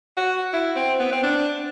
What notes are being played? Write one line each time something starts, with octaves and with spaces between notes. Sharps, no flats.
F#4
E4
C4
B3
C4
D4